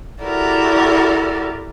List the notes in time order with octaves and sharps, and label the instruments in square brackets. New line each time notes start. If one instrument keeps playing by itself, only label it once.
[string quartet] E4 F#4 G4 A4 A#4 D5